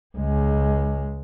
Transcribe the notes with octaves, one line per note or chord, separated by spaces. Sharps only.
C#2 G#3